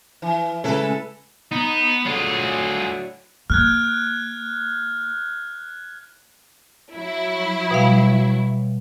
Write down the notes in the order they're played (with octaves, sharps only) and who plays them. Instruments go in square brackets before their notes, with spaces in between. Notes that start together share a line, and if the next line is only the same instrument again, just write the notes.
[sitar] E3
[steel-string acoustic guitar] C#3 G#3 [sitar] E4 A4 B4
[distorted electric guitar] B3 [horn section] D#4
[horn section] A2 D3 F#3 [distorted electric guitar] F4 G#4
[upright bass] A#3 [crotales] F6 F#6 G#6
[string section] F#3 E4
[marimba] B2 G3 F5